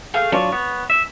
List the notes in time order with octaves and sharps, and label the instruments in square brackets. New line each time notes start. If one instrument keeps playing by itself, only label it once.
[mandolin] A3 G#4 F5
[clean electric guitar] F#3 D4 F4 [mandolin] C#5
[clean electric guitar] B3
E5